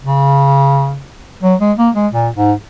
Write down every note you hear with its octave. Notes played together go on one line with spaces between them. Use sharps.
C#3
F#3
G#3
A#3
G#3
A#2
G#2